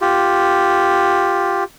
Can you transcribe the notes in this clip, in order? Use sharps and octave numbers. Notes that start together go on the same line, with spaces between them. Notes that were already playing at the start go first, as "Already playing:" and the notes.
F4 G4